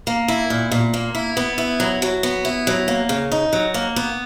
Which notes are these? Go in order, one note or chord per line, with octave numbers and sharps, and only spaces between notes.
A#3
E4
A#2
A#2
A#3
E4
B3
E4
F#3
F#3
B3
E4
F#3
A#3
C#3
D#4
F#3
A#3
B3